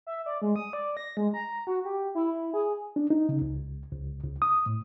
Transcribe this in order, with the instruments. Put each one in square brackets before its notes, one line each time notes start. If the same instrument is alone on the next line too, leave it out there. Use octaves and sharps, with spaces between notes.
[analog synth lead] E5
D5
G#3
D#6
D5
A#6
G#3
A#5
F#4
G4
E4
G#4
[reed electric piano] D4
D#4
C#3
C#2
C#2
C#2
D#6
A2